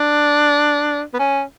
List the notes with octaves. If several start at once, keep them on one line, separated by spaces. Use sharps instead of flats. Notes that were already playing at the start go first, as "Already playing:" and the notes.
Already playing: D4
B3
C#4